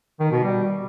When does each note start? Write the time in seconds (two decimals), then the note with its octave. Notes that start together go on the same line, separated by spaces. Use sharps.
0.19 D#3
0.31 B2
0.43 G3